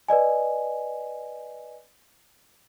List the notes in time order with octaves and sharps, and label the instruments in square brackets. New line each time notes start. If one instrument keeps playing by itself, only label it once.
[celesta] B4 D5 D#5 G#5